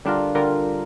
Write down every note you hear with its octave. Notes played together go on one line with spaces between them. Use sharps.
D3 G3 D4 F4 A#4
D3 G3 F4 A#4